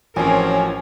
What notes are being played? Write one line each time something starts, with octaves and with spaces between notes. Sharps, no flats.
A1 F3 F#3 C4 C#4 G#4 A#4 G#5